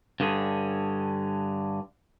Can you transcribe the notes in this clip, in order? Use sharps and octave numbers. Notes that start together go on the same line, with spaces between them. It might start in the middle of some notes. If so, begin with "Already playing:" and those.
G2 D3 C#4 G#4